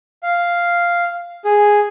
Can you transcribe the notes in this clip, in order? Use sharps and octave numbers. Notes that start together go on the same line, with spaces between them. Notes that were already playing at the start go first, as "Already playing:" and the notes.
F5
G#4